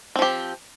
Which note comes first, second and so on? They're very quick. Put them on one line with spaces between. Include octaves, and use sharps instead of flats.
C4 F3 G4